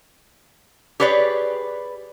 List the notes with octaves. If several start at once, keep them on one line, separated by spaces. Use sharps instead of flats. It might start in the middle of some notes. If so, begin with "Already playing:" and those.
G4 G#4 B4 C#5 D5